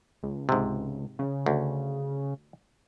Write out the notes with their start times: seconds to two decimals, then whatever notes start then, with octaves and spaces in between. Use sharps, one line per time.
0.23 C#2
0.49 G#2 C3
1.19 C#3
1.46 D2